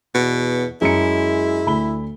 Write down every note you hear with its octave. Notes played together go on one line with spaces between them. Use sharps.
E2 B2
F#2 G#3 E4 C#7
D2 B5 G7